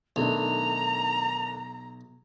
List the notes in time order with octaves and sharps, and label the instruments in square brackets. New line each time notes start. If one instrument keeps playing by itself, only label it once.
[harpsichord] B1 [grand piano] D#3 A3 D4 [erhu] A#5 [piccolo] F7